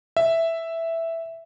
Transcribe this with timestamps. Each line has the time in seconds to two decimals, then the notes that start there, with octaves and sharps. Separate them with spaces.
0.17 E5